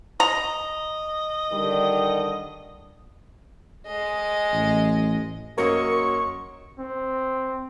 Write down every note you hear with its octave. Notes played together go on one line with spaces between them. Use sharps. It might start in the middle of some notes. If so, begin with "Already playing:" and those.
D#5 A#5
D3 D#3 G3
G#3 D#5
A1
F#2 F#3 A#3 A#4 D#5 C#6
C4